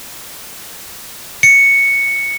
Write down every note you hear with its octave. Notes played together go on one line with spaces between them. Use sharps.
C#7